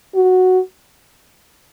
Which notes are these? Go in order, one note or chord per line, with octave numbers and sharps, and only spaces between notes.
F#4